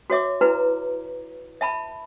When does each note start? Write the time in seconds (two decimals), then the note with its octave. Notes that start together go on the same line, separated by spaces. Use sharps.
0.10 F#4 C#5 E5 D6
0.41 D#4 E4 F#4 B4 A#5
1.61 E5 A5 B5